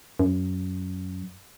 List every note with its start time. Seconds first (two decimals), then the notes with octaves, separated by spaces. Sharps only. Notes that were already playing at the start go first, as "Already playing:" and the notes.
0.19 F#2